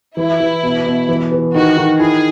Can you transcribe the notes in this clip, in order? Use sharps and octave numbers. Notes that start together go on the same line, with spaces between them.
E3 E4
E3
B2
B2
E3
E3
D#3 F#4
D#3
E4 G#4